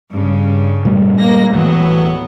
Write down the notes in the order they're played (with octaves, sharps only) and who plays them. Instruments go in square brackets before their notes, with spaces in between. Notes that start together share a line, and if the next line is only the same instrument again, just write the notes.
[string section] G2 C#3
[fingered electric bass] A#2 G3 A3
[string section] G#3 A#3 A#6
[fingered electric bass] D#1 E3 [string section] A2 F#3 B3